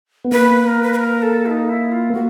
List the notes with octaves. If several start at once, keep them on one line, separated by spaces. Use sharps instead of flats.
B3
A#3 B4
B4
A#4
B4
B4
A#4
A4
E4
D#4
E4
F4
A#3 F#4